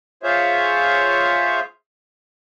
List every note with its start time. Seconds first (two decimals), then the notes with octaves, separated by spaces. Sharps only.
0.23 F4 G#4 C5 C#5 E5 F5